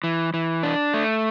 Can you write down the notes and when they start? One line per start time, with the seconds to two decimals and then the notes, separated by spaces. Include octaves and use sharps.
0.04 E3
0.34 E3
0.63 D4
0.94 A3